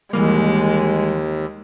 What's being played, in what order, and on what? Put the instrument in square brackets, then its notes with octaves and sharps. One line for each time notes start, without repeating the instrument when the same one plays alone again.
[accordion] D#2 [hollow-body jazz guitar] E3 G3 A#3 [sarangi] G#3